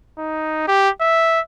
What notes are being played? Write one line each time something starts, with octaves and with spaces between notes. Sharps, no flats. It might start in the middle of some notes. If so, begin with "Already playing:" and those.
D#4
G4
E5